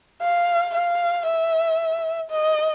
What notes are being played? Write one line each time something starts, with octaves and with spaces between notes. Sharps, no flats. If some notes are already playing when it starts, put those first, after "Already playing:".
F5
F5
E5
D#5